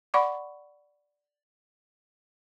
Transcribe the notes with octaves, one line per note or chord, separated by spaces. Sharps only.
D5 F#5 B5 C#6 D6